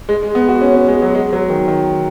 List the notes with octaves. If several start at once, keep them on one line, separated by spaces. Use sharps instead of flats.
G#3
G#3
B3
F#4
C#4
C#4
G#3
F#3
G#3
F#3
D#3
D#3